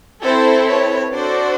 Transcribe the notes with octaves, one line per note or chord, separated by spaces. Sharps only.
C4 E4 A4 C5
B4 C#5
D4 F#4 A4 C5 D5